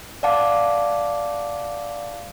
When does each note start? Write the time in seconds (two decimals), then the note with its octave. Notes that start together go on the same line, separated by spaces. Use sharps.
0.23 D5 F5 F#5 A5 D6